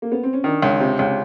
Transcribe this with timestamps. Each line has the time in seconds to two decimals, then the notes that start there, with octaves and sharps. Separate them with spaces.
0.02 A#3
0.12 B3
0.23 C4
0.33 C#4
0.44 D#3 D4
0.62 C#2
0.80 C3
0.99 C#2